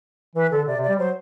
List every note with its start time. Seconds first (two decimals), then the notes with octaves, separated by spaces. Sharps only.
0.35 E3 B4
0.51 D3 A4
0.67 C3 D5
0.77 C3
0.83 D5
0.88 G3
0.98 F#3 C5